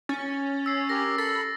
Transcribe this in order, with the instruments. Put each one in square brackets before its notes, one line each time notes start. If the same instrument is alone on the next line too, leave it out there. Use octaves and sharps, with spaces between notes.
[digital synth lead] C#4 [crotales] A6
[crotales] E6 C7
[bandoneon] G4 A#4 [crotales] A#6
[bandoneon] A4 [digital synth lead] B5 [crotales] A6